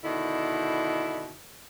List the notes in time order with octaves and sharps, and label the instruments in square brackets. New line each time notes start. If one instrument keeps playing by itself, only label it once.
[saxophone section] B2 D3 D#3 E4